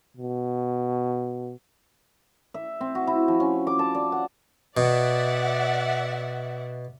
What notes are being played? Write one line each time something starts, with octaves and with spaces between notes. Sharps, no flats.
B2
E5
C4
F#4
E4
F3
C#4
D6
A5
D5
F#5
B2 D5 E5 F#5